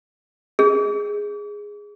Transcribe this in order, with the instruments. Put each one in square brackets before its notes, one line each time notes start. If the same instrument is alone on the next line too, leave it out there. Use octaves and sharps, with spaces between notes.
[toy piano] G#4